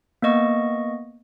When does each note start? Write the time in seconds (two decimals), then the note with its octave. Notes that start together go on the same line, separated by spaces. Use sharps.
0.22 A#3 B3 D#5 C#6